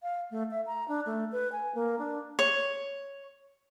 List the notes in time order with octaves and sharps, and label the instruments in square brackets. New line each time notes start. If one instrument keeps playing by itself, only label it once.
[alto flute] F5
A3
E5
A#5
D4
A3
B4
G#5
A#3
D4
[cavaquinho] C#5